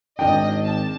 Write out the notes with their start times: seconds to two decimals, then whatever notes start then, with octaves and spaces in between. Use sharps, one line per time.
0.19 G#1 D#3 D4 D#5 G5
0.64 A5